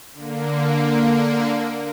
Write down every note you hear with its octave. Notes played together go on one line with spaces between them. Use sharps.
D3 A#3